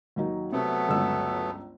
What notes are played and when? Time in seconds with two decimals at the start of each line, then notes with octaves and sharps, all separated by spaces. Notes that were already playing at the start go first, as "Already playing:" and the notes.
0.16 D#2 F#3 D#4
0.52 C3 F#3 A3 B3
0.89 G1 C#2 E6